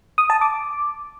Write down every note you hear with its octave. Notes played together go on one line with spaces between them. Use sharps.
D#6
A5
D6